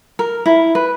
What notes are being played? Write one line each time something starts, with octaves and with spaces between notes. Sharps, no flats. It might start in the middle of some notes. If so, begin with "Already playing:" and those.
A#4
E4
B4